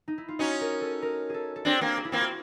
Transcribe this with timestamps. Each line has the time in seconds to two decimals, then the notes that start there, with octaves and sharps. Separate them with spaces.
0.08 D#4
0.18 E4
0.28 F4
0.39 C#4 D#4 F#4
0.61 A#4
0.81 A4
1.02 A#4
1.30 G#4 A4
1.56 A4
1.65 C4 D4 G#4
1.81 A#3 C4
1.97 G#4
2.05 E4
2.12 A#3 C4 F4
2.21 F#4